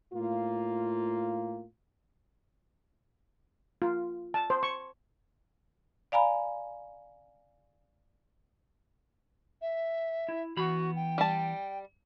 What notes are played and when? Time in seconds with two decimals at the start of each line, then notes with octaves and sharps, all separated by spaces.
0.14 A2 A#3 F4
3.82 F4
4.34 A5
4.50 C5
4.63 C#6
6.12 D5 F5 G#5 A#5 B5
9.62 E5
10.28 E4
10.57 E3 B3 F#4 B5
10.96 G5
11.18 G3 A5